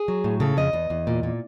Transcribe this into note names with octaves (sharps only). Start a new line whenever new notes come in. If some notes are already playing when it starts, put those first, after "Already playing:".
Already playing: G#4
F#3
A2
C#3 A4
F2 D#5
E2
E2
A#2
A#2